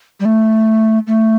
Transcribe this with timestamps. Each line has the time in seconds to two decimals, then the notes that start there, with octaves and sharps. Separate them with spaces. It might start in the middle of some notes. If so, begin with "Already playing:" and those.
0.20 G3
0.25 A3
1.07 A3